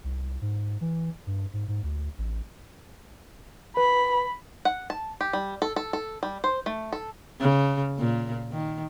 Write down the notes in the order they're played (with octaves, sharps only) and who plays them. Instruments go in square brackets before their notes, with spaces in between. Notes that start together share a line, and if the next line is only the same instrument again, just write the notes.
[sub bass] C2
G#2
E3
G2
G#2
G#2
D2
A1
[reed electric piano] B4 [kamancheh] B5
[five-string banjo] F#5
A5
G4
G3
A4
A4
A4
G3
C5
A3
A4
[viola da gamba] C#3
A#2
D#3